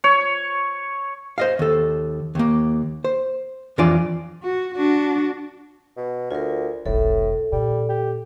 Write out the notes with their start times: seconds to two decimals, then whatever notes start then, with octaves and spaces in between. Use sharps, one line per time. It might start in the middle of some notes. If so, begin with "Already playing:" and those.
0.04 C#5
1.38 C5 D#5 F5
1.59 D#2 A4
2.35 D#2 A#3
3.04 C5
3.78 F2 E3 D4 F4 D5 G#5
4.43 F#4
4.75 D4 F#4
5.97 B2
6.31 D2 F4 A#4
6.86 F1 B1 A2 A4
7.52 A#2 G3
7.89 G4